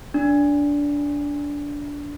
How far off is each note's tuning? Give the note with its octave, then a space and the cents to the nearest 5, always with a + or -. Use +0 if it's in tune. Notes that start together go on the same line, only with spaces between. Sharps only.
D4 -20